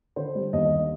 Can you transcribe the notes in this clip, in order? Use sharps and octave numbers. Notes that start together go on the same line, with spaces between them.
D3 C5
G3
D#2 D#5